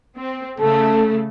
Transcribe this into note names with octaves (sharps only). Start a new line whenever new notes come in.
C4
C#3 A3 A4